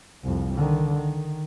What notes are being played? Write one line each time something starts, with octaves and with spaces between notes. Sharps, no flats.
C2 F2
D3 D#3
D#3